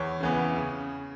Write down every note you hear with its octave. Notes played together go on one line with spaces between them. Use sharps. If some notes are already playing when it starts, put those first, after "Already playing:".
Already playing: E2 C#5
C#3 E3 B3
C#3